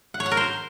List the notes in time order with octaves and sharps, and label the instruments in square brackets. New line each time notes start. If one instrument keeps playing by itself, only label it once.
[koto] F#5
C#5
F#5
A#4
C5